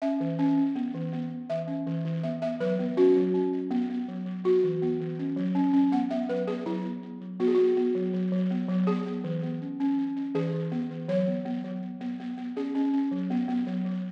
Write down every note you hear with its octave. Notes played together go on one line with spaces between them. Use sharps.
C#4 E5
E3
C#4
C#4
B3
E3
B3
B3
E3 E5
C#4
E3
E3
B3 E5
B3 E5
F#3 B4
B3
C#4 F#4
F#3
C#4
C#4
B3
B3
F#3
F#3
B3 F#4
E3
B3
E3
C#4
F#3
C#4
C#4
B3 F#5
B3 E5
F#3 B4
B3 G#4
F#3 E4
B3
B3
F#3
B3 F#4
G#4
B3 F#4
B3
F#3
F#3
F#3
B3
F#3
B3 G#4
B3
E3
B3
C#4
C#4
C#4
C#4
E3 G#4
E3
B3
E3
F#3 C#5
B3
B3
F#3
B3
B3
B3
B3
C#4 G#4
C#4
C#4
F#3
B3
B3
F#3
F#3